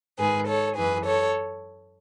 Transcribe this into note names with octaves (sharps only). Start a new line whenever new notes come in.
G#2 D#3 G#4 B4
A4 C#5
F#2 E3 G#4 B4
A4 C#5